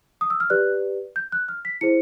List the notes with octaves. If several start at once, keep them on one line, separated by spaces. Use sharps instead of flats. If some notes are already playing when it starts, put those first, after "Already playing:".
D#6
E6
F6
G4 B4 D5 F#6
G6
F#6
F6
B6
E4 G#4 C5 C#7